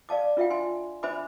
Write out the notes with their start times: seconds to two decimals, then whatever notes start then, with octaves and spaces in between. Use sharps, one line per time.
0.09 D5 F5 A5 D6
0.37 D4 F4 E5 F5 G5
0.50 G#5 C6
1.03 D4 C5 E5 G#5 B5 D6